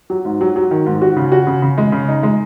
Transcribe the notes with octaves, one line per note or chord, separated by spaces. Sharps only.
F#3
G#2
F#3
F#3
D#3
G#2
F#4
C#3
F#4
C#3
C#3
G#3
C#3
D#4
G#3